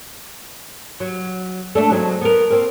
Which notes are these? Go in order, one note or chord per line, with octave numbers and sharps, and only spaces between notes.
F#3
A3 D4 A4
F#3 G#3 C4
B3 A#4
A#3 C4